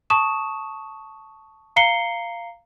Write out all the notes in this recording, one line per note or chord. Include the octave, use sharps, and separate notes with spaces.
A5 C#6 D#6 E7
F5 A#5 C7 C#7 G7